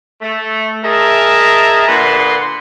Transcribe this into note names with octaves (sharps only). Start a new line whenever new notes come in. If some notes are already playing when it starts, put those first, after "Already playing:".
A3
G#4 A#4 D#5 E5 A5 A#5
A#2 D3 B4 F#5 C6